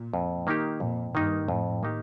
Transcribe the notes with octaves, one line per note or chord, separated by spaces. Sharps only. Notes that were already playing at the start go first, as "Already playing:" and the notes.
Already playing: A#2
F2
D#3 A#3 D#4 G4
F2 A#2
G2 D#3 A#3 D#4 G4
F2 A2
D#3 A#3 D#4 G4